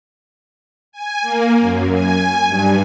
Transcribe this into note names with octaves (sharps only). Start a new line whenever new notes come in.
G#5
A#3
F#2
G#5
G2